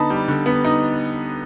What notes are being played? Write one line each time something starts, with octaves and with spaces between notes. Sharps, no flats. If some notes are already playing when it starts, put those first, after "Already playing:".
Already playing: D3 B3 D#4 A5 B5
G3
D3
B3
D#4